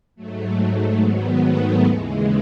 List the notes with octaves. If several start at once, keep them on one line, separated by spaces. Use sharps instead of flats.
G#2 F#3 A3
A3
G#2 D#3 F#3 B3
A3
D#2 C#3 E3 G#3